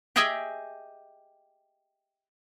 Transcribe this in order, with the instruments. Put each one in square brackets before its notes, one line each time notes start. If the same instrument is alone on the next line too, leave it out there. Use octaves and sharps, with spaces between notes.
[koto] G4 G#4 D#5 E5 G5 G#5